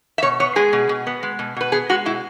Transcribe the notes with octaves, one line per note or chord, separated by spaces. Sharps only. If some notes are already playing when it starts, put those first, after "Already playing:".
E5
B2 C#5
B3 C#5
G#3 G#4
B2
B2
B3
G#3
B2
B2 B4
B3 G#4
G#3 F#4
B2 E4